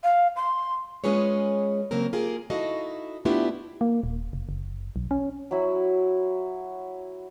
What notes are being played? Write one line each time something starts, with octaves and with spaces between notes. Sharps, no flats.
F5
C6
G#3 C#4 F4 G#4 B4 C#5
C#3 F#3 A#3 C4 A#4
A#3 F4 G4 G#4 A#4
D#4 E4 F#4 A4 D#5 F5
A3 B3 D4 E4 F4 G4
A#3
D#1
F1
F#1
B1
C#4
F#3 E4 F#4